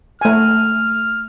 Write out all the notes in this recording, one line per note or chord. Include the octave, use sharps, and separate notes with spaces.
A3 G#5 F6